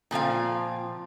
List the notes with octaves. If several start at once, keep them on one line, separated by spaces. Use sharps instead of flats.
A#2 F3 C4 F5